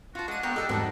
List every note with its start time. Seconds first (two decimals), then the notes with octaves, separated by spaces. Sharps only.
0.15 F4 F#4 A5
0.28 G#3 D4 F#5 D#7
0.43 A#3 B3 A4 C#5 G5 A#5
0.56 G4 A4 B4 D#5 E5 F#5
0.69 E2 G#2 G3 C4 D#4 F#4 G#4 A5